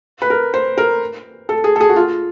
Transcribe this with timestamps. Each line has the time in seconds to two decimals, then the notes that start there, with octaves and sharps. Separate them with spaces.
0.22 B4
0.30 A#4
0.54 C5
0.78 A#4
1.49 A4
1.64 G#4
1.76 A4
1.81 G#4
1.89 F#4
1.96 F4